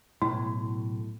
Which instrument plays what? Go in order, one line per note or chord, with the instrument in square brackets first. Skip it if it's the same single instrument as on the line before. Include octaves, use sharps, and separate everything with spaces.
[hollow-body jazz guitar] B1 A2 [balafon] E4